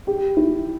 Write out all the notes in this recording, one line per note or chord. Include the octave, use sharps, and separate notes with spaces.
G4
E4